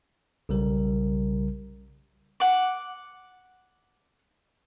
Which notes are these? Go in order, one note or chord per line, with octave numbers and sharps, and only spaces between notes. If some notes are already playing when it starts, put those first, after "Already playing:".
B1 C#3 G3 A#4
F#5 D6